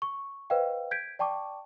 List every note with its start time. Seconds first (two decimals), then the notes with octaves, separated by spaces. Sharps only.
0.02 C#6
0.50 B4 C5 D#5 F5 G5
0.91 G6 G#6 B6 D7
1.19 D5 G5 A5 C#6 D6